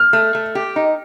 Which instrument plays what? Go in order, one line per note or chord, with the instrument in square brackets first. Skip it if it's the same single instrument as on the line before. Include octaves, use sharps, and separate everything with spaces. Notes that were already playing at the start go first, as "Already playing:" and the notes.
Already playing: [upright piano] F6
[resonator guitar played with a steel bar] A3
A3
G4
D#4